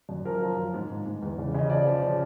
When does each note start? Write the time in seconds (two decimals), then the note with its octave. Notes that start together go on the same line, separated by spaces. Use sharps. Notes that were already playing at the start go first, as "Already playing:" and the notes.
0.09 F#2
0.25 F3 A#4
0.42 F3
0.57 F3
0.74 G#2
0.90 G#2
1.06 G#2
1.22 E2
1.38 C#3
1.54 C#3 D#5
1.70 F3 D5
1.86 F3
2.02 C#3